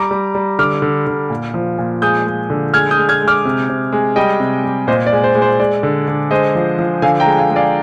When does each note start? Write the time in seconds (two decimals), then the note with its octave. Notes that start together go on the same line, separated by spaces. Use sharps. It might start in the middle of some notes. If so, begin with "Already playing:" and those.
Already playing: G3 A#5 D6
0.11 G3
0.35 G3
0.59 D3 D6 F6
0.82 D3
1.07 D3
1.30 A#2
1.54 F3
1.78 A#2
2.02 G#3 D#6 G6
2.26 G#3
2.50 D3
2.74 G#3 F6 G#6
2.91 D#6 G6
2.98 G#3
3.09 F6 G#6
3.22 G#3
3.28 D6 F6
3.45 C3
3.69 C3
3.92 G#3
4.16 G3 D#5 G5
4.40 C3
4.64 G3
4.87 A#2 C5 D#5
5.07 D5
5.12 G#3
5.24 C5
5.35 G#3
5.42 C5
5.60 G#3 D5
5.83 D3
6.08 D3
6.31 G#3 C5 D#5
6.55 F3
6.79 F3
7.02 D3 F5 G#5
7.20 G5 A#5
7.26 G#3
7.38 F5 G#5
7.50 G#3
7.56 D5 F5